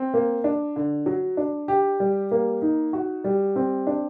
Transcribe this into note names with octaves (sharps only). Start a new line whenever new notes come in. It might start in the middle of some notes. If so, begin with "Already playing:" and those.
Already playing: C4
A#3
D4
D3
F#3
D4
G4
G3
A#3
D#4
F#4
G3
C4
D4